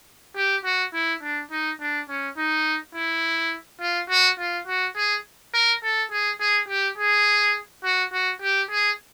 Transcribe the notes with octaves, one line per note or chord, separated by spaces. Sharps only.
G4
F#4
E4
D4
D#4
D4
C#4
D#4
E4
F4
F#4
F4
F#4
G#4
A#4
A4
G#4
G#4
G4
G#4
F#4
F#4
G4
G#4